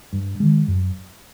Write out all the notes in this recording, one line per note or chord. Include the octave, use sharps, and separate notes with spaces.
G2
D#3 G#3
F#2